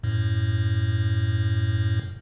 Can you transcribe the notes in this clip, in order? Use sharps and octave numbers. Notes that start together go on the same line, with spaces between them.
F#2 A2